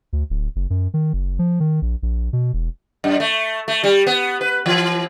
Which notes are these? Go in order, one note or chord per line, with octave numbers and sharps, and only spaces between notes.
D2
D1
F#1
F#2
D#3
F#1
F3
D#3
A#1
A#1
B2
E1
F#2
A3
A3
G3
B3
B4
E3